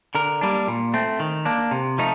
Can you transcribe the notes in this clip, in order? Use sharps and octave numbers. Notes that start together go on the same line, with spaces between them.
D3 A#4
G3 A#3 D4
A#2
A3 C4
D#3
A#3 D4
C3
F3 A3 D#4